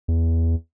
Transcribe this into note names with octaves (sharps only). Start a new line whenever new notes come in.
E2